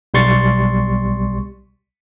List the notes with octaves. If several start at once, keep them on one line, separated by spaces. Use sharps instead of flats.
B1 G3 C6 C#6 A6